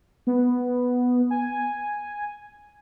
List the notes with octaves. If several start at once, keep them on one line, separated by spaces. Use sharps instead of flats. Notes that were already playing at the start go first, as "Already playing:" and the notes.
B3
G#5